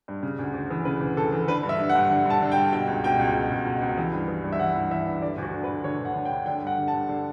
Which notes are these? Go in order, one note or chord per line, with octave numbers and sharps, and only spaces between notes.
G2
C#3
D2
D2
E3
C#3 B4
D2
D2 A4
E3
D3 B4
G2
E5
D3
F#5
G2
D3
G2
A5
D3
G5
G2
B2 G5
C#2
B2 G5
C#2
B2
C#2
B2
C#2
E3
G2
E3
G2
E5
E3 F#5
G2
E3 E5
G2
D3 D5
D2 F#4
D3
B4
D2
D3 C#5
D2 F#5
D3
G5
D2
D3 G5
G2 F#5
D3
A5
G2
D3